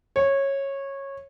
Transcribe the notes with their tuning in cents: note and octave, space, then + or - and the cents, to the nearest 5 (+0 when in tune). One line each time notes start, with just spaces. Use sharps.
C#5 -15